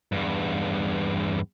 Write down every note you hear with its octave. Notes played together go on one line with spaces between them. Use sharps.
E2 G2